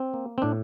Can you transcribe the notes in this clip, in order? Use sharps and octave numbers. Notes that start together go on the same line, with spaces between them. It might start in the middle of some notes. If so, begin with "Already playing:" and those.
Already playing: C4
A#3
C4
A2 D4